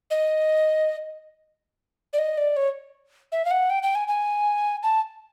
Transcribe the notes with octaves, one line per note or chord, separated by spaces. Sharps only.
D#5
D5
D#5
D5
C#5
E5
F5
F#5
G5
G5
G#5
G#5
A5